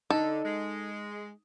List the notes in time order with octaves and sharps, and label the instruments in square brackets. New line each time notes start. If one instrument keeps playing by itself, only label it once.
[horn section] D3 [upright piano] D#4 [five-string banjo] A4
[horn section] G#3